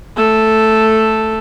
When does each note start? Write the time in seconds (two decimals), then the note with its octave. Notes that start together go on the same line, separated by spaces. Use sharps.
0.16 A3 A4